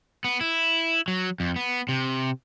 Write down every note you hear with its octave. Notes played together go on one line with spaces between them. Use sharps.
B3
E4
F#3
F2
B3
C3